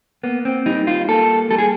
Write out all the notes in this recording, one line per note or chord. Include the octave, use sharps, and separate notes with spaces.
A#3 B3
C4
G3 D#4
F4
A#3 A4
G3 A4
G#4